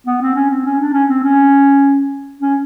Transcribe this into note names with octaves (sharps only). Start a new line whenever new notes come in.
B3
C4
C#4
C4
C#4
D4
C#4
C4
C#4
C#4